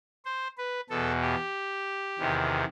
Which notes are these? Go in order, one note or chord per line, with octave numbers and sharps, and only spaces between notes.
C5
B4
E2 B2 A4
G4
E2 C3 D#3